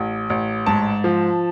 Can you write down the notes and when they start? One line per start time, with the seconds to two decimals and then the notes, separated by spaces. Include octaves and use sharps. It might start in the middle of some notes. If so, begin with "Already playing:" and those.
Already playing: A1
0.30 A1
0.66 G#2 A5
1.04 F3